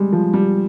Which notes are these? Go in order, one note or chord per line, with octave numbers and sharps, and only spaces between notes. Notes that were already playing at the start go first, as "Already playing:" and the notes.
Already playing: G3 G#3
F3
G3